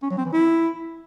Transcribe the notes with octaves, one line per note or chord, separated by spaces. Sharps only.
C#4
F#3
C4
E3
E4